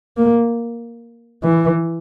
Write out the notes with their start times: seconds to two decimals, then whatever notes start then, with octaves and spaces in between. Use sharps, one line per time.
0.17 A#3
1.43 E3